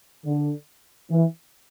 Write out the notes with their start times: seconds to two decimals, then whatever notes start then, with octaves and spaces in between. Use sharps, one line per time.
0.25 D3
1.10 E3